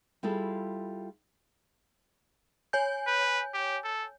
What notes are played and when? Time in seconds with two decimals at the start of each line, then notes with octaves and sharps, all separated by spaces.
0.23 G3 E4 F4 G#4 A4
2.73 C#5 G#5 G6
3.07 B4
3.54 G4
3.84 A4